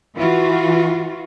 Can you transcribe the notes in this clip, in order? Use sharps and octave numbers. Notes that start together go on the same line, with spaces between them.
E3 F4 F#4